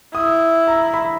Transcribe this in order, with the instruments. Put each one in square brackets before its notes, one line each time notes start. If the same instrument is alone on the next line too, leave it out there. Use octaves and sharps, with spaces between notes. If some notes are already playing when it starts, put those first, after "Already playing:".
[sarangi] E4 [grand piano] D#6
[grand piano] A#5
B5